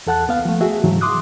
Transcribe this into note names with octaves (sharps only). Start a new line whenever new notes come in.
E2 A4 F#5 A5 F#6
C#2 B3 F5
F3 A3
F#4 G#4 E5
G#2 C#3 E3 F#3
C6 D6 D#6 F#6